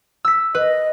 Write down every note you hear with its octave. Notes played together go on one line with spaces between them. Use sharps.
E6 B6
B4 D#5